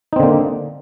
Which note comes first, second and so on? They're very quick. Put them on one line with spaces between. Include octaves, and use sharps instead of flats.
D#4 C4 D3 A#3